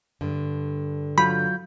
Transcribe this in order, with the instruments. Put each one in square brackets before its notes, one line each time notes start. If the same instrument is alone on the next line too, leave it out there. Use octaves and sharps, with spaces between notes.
[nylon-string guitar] G2 D3
[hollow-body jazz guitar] F#3 F4 [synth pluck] B5 [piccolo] G6